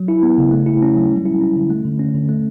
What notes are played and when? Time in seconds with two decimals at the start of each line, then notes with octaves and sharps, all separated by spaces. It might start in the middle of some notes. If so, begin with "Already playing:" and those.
Already playing: F#3
0.08 E4
0.23 B3
0.38 C#3
0.52 A3
0.66 E4
0.82 C#4
0.96 F#3
1.12 G3
1.26 E4
1.41 C#4
1.56 D3
1.70 A3
1.84 D3
1.99 C#4
2.14 D3
2.29 A3